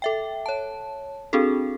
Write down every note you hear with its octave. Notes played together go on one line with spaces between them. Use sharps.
A4 E5 G5
C#5 A5
C4 D4 F#4 G#4 A4